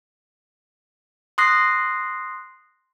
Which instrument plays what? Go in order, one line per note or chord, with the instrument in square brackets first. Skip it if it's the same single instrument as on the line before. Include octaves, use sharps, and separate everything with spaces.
[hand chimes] C6 D#6 F#6 A#6 C7